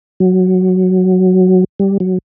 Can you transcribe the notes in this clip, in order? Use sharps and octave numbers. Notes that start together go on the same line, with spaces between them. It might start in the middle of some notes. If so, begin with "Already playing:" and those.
F#3
G3
F#3